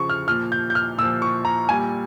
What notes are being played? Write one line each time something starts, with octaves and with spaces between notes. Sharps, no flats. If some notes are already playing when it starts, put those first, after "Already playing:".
Already playing: C#3 F3 C#6
F6
A#2 F3 F6
G6
G6
F6
A#2 F3 E6
C#6
A#5
A#2 G3 G#5